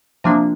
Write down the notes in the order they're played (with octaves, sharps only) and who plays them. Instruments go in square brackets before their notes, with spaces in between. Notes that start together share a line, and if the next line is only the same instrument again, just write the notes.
[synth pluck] C3 F3 A#3 D4